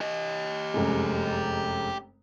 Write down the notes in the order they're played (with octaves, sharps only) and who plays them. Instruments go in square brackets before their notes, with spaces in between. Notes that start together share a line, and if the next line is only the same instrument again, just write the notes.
[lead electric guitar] G4 D#5
[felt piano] F1 F#2 G#3